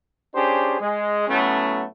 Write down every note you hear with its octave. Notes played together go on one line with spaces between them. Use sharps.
C#4 D4 G4 G#4 C5
G#3
A2 F#3 A3 B3 C#4